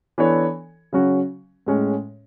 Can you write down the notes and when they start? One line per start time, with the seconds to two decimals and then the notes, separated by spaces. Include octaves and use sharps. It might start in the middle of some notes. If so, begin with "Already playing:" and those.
0.18 E3 B3 D4 A4 C#5
0.93 C#3 F#3 C#4 F#4
1.66 A2 G#3 C#4